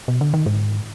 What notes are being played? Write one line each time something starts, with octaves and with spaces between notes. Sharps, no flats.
B2
D3
D#3
G#2